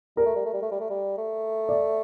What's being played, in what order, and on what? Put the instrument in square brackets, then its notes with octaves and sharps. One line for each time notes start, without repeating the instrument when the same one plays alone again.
[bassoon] G3 [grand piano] A#4
[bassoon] A3
G3
A3
G3
A3
G3
A3
G3
A3
[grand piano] D5